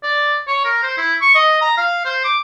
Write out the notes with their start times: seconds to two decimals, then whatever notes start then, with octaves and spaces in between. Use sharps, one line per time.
0.03 D5
0.47 C#5
0.65 A#4
0.83 C5
0.97 E4
1.21 C#6
1.35 D#5
1.61 A#5
1.77 F5
2.05 C5
2.24 D6